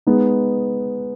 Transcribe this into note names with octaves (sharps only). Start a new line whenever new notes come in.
G#3 B3 D#4